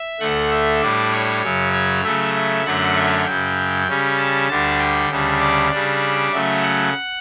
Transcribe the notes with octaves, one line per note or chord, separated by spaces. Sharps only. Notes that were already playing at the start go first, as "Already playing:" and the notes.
Already playing: E5
D2 D3 A3 F#5
E5
A2 G3 D4 D5
C#5
F#2 C#3 F#3
C#5
C#3 F#3 A3 E5
E5
F#2 D3 F#3 A3 C#4 F#5
E5
F#2 C#3 F#3 G5
C#3 G3 C#4
A5
D2 D3 G3 A5
G5
D2 C#3 G3 D4
D5
C#3 G3 D4
C#3 F#3 A3 E5
F#5